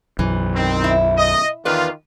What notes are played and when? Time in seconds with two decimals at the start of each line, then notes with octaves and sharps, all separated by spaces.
0.19 B1 F#2 E3
0.55 D#3 C4
0.84 E4
1.17 D#5
1.65 E2 D#3 F4 B4 D5